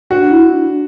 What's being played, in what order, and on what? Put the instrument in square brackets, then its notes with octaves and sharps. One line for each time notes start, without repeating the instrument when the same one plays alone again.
[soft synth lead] D4 [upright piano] F#4
[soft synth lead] E4
D4